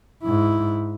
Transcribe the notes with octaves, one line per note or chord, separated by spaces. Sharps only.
G#2 E4